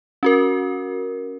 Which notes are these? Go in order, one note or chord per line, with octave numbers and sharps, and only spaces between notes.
C#4 F#4 A#4